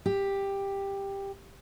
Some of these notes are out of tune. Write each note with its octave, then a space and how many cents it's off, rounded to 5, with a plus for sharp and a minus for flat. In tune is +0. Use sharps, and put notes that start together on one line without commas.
G4 +10